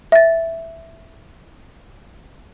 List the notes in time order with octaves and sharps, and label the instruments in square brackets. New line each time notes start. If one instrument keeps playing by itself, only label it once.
[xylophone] E5 A6